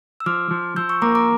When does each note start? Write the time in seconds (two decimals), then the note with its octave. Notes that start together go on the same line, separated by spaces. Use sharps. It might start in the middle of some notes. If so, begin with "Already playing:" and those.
0.20 E6
0.26 F3 D6 F6
0.51 F3
0.76 F3 E6 G6
0.89 C#6 E6
1.02 A#3 A#5 D6
1.15 A#5 D6